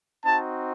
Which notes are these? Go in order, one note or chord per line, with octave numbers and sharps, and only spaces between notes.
C4 D#4 F#4 A5